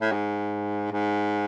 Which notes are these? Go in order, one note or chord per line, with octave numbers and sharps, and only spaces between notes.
A2
G#2
G#2